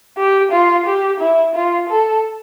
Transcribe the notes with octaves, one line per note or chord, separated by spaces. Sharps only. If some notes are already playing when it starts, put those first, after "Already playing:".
G4
F4
G4
E4
F4
A4